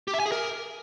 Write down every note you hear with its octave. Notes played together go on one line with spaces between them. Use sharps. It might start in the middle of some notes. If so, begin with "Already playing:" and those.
G4
E5
G#5
G#4
A#4